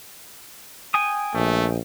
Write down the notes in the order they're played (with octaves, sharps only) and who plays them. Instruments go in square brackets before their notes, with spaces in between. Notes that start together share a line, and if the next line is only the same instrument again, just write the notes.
[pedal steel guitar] G5 G#5 D#6
[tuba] A#1 [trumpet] A3